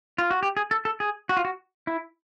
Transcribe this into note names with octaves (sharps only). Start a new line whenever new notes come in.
F4
F#4
G4
G#4
A4
A4
G#4
F#4
F4
F#4
E4